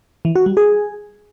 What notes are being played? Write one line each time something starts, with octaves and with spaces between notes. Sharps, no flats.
E3
F#4
G3
G#4